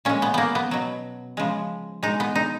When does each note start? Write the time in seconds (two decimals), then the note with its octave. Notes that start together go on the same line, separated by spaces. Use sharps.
0.05 A#2 G#3 C#4
0.22 B3
0.34 A#3 B3
0.55 B3
0.71 B2 F#3
1.37 C#3 F3 G#3
2.03 B2 G#3 D#4
2.20 B3
2.36 D#4